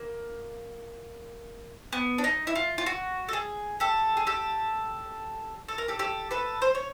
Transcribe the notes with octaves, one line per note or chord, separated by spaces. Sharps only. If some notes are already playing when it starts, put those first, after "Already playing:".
Already playing: A#3
B3
D4
D#4
E4
F4
F4
F#4
A4
G#4
G4 A4
G#4
G4 A4
A4
A#4
G4 A4
G4 A4
A4 B4
C5
C#5